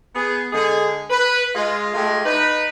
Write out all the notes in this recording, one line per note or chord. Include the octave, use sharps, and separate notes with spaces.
B3 G#4
D3 G#3 G#4
B4
G#3 F4
G#3 A3 F4 G4
D#4 B4